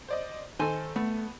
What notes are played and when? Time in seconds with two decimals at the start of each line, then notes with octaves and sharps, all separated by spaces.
0.08 C5 D5 D#5
0.59 D#3 A4 C5 G#5
0.96 A3 B3